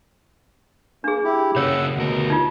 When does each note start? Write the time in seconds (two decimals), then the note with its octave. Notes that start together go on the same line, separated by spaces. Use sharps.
1.04 A#3 D4 G#4
1.24 E4 G4
1.56 C#3 A#3 C#5 F#5 E6
1.96 D2 B2 A#4
2.30 D#4 F4